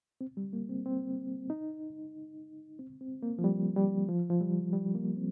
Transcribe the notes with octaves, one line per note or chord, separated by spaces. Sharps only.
C4
G3
A#3
C4
C4
D#4
C4
C4
A#3
F3
G3
G3
F3
F3
G3
G3
A#3
C4